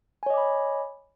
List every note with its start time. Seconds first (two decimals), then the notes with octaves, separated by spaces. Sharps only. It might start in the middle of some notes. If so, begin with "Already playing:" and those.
0.23 G#5
0.26 C#5
0.30 D#5
0.34 D6
0.38 B5